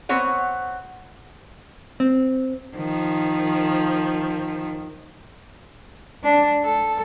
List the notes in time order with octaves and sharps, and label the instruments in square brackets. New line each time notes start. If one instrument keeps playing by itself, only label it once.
[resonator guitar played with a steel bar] B3 C4 C#5 F#5
[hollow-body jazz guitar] C4
[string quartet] D#3 F3
[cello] D4
A4